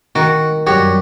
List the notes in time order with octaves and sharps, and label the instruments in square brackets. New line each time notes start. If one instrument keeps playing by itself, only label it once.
[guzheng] D#3 [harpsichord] F#4
[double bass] F#2 G3 [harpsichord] F#4 G4 [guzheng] C#5